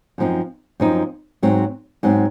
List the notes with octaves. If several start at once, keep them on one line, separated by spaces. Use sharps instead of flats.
F#2 F3 C4 D#4
F#2 F3 C4 D#4
G#2 F#3 C4
G#2 F#3 C4